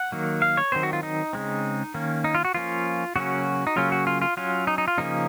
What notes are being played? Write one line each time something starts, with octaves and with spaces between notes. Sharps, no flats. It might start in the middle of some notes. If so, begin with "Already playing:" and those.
Already playing: F#5
D#3 F#3 A#3
F5
C#5
D#3 F#3 C4 C5
F#4
F4
D#4
C#3 G#3 C4
D#3 A#3 C#4
D#4
F4
F#4
F3 A#3 C#4 F4
C#3 F#3 A#3 C#4 F#4
D#4
C#3 F#3 A#3 C#4 F4
F#4
F4
F4
F#3 C#4 F4
D#4
D#4
F4
C#3 F3 A#3 C#4 D#4